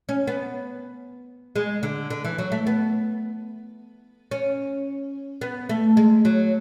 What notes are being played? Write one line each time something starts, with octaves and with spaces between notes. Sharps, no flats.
C#4
B3
G#3
D3
D3
E3
F#3
A3
B3
C#4
B3
A3
G#3
F#3